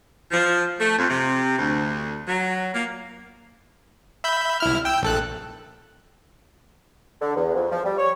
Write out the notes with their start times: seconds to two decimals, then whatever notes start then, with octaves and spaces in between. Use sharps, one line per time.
0.31 F3
0.80 A3
0.98 F2
1.10 C3
1.58 D2
2.27 F#3
2.74 A#3
4.24 E5 B5 G6
4.60 C2 E4 F6
4.85 G5 E6
5.02 A#1 A4 F#6
7.21 D3
7.36 E2
7.55 F2
7.71 F3
7.85 G3
7.98 C#5